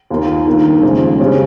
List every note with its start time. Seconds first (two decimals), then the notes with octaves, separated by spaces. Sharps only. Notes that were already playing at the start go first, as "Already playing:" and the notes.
0.10 D#2 D#3 A#3 F4
0.47 G2 D#3 A#3
0.83 F2 C#3 G#3
1.20 C#3 G3 C#4